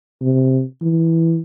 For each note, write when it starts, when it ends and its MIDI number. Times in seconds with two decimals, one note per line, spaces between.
0.22 0.63 48
0.82 1.40 52